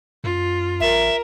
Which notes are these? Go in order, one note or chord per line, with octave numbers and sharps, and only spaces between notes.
F#2 F4
A#1 A#4 E5